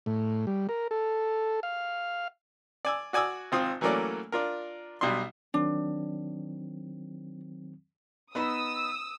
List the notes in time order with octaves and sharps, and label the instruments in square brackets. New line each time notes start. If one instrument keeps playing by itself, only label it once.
[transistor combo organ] A2
G3
A#4
A4
F5
[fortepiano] D5 G#5 E6
F#4 D5 G#5 D#6 E6
G#1 C4 F4 D#6
E3 F#3 A3 A#3 C#4 D5
D4 F4 A#4
B1 B2 G3 D4 C6
[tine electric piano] D#3 F#3 C4 [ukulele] D4
[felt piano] B3 D#4 B5 [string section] D#6 E6